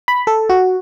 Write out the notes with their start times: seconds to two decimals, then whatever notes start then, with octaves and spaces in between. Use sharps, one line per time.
0.08 B5
0.27 A4
0.50 F#4